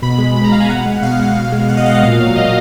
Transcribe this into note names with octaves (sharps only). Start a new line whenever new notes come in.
B2 B5
G#3
B2 B5
A#5
G#3 F5
G#5
B2 F#5
G#3
B2 F5
G#3
B2
G#3
B2 F#5
D#5
G#3 F5
F#5
A#2 F5
F#3
A#2 D#5